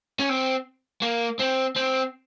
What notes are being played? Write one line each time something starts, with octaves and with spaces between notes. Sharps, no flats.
C#4
C4
A#3
C4
C4